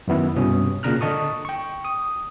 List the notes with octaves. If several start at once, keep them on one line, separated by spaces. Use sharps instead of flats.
F#2 D#3 B3 E4
C2 G2 B2 C#4 D#6
A#2 C#3 D4 A#5 F6 F#6
D3 D#5 A5 C#6 D#6
G5 C#6
D#6